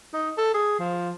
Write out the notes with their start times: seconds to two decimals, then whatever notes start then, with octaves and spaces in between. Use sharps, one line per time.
0.13 D#4
0.38 A4
0.54 G#4
0.79 F3